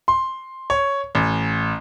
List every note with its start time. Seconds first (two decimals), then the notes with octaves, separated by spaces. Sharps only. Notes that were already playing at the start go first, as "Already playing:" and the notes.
0.08 C6
0.70 C#5
1.15 A1